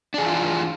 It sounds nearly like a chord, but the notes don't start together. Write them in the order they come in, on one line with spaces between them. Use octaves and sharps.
D4 G#4 E3 F4